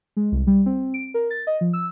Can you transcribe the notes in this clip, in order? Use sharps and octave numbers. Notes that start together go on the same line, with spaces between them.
G#3
C2
G3
C4
D7
A#4
A6
D#5
F3
E6